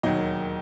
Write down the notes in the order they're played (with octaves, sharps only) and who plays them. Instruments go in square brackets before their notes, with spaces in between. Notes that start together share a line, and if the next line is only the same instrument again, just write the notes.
[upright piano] E1 D#2 D#3 F#3 D#5